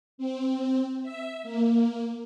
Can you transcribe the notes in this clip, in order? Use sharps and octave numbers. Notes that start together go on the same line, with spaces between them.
C4
E5
A#3